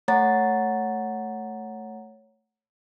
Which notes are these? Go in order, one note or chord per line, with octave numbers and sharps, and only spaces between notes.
A3 C#5 F#5 A#5 A6